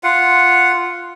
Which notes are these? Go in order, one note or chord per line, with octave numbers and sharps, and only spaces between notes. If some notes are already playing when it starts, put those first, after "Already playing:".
F4 F#5